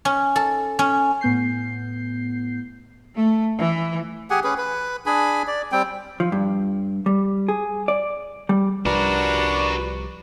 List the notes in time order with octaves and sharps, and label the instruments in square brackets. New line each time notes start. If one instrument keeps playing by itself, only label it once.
[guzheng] C#4
A4
C#4
[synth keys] A2 B3 G6 C7
[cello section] A3
E3
[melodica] G4 G#4 F#5 G#5
C#4 G#4 B4
B4
D4 G#4 G#5 B5
D5
G3 C4 G5
[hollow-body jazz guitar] F3
G2
G3
G#4
D5
G3
[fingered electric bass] C2 F3 G3 [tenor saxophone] D4 [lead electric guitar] F#4 A#4 [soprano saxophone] B4